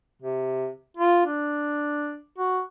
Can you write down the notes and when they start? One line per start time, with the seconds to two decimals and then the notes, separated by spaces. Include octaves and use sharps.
0.22 C3
0.97 F4
1.26 D4
2.38 F#4